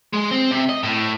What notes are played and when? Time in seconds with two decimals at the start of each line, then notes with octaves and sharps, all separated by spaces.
0.13 G#3
0.31 C4
0.51 C3
0.69 D#5
0.83 A2